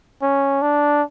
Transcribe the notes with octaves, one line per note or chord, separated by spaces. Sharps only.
C#4
D4